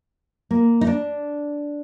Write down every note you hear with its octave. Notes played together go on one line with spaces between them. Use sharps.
A#3
D#4
D4